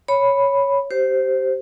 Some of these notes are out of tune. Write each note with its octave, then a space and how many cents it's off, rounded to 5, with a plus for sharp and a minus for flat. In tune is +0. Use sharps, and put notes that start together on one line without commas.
C#5 +0 B5 +0
G4 -20 C5 +0